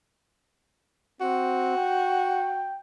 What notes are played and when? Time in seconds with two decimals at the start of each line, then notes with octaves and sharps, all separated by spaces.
1.21 C4 F#4
1.77 G5